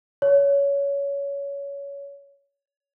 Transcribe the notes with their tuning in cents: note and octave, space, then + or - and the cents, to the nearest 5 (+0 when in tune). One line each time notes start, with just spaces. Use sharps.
C#5 +20